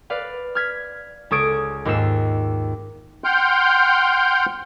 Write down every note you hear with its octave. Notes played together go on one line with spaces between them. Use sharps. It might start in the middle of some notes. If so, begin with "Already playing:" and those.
B4 D5 F5
F6 G#6 B6
C#2 A4 C#6 D#6 G#6 D7
D#2 G#2 F4 E6 C7 E7
F#5 G5 C6 F6 G6